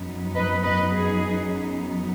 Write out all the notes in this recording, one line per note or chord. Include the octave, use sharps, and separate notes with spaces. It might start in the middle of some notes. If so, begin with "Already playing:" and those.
Already playing: F#2 F#3 B3 D#4
B4 D#5
B4 D#5
G#4